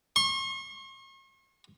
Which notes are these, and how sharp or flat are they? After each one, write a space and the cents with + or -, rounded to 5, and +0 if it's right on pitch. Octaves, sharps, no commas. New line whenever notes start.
C#6 -45